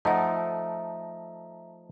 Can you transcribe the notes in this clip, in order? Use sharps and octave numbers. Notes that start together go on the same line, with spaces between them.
F3 A3 D#4 D#5 E5 F#5 A#5